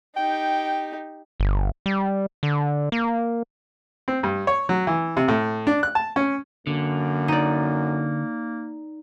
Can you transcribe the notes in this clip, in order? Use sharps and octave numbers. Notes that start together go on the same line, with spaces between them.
D#4 G4 G5
G1
G3
D3
A#3
C4
G2
C#5
F#3
E3
C3
A2
D4
F#6
A5
C#4
F#2 D3 A#3
D#4 D5